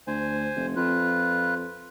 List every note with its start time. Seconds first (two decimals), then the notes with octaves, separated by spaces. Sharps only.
0.07 D2 C5 G#5
0.56 F1
0.76 F2 F4 B4